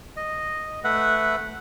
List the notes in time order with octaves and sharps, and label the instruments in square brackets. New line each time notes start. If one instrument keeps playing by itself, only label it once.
[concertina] D#5
A3 B4 E5 F#5